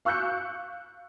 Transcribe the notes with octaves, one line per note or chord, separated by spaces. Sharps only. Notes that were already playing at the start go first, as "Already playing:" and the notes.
F5 C#6 E6 F#6 G6 C#7